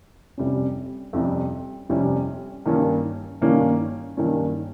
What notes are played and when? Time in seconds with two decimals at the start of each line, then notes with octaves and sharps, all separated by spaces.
0.38 F2 C3 G3 C#4
1.13 F2 C3 G3 C#4
1.89 F2 C3 G3 C#4
2.66 G2 D#3 A#3 C#4
3.42 G2 D#3 A#3 C#4
4.17 G2 D#3 A#3 C#4